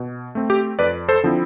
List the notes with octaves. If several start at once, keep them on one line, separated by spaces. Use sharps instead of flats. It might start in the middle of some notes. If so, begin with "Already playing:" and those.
Already playing: B2
A3 C4
G4
F2 B4 D5
A4 C5
D3 F3 C4 E4